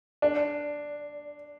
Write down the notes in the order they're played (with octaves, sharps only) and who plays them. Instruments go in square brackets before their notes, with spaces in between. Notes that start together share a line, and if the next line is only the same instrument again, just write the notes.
[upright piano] D4